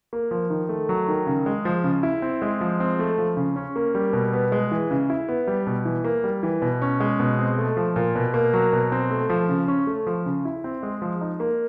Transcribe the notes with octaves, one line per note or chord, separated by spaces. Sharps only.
A#3
F3
D#3
A3
F#3
D#3
C#3
G#3
F3
C#3
E4
C4
G#3
F3
C4
A3
F3
C#3
C#4
A#3
G3
B2
B3
G#3
E3
C#3
E4
B3
G3
B2
E3
A#3
G3
E3
B2
C#4
G#3
B2
C4
A3
F3
A#2
B2
A#3
F#3
B2
C4
A3
F3
C#3
C#4
A3
F3
C#3
E4
C4
G#3
F3
D#4
A#3